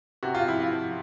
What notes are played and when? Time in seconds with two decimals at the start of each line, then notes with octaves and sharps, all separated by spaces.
0.23 C3 F#4
0.35 F4
0.47 F3 E4
0.60 F4
0.71 F3